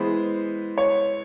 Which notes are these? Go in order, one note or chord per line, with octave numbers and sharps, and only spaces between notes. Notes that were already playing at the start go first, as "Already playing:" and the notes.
Already playing: E3 G#3 B3 C5
C#5